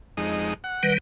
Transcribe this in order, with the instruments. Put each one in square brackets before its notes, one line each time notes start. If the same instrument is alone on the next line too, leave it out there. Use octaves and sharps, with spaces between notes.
[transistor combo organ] F2 G#3 D#4
F#5
[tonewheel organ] D#3 G3 B4